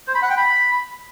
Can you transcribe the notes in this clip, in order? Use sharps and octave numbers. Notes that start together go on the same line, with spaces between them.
C5
B5
F#5
G5
B5